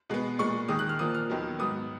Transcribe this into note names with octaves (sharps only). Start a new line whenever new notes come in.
B2 G#3 B3
A#2 G#3 B3 C#6
D#2 D#3 G#3 D#6
F#6
F6
A#2 F3 A#3 D#6
F6
D#2 D#3 F#3 B3
G#2 F#3 B3 D#6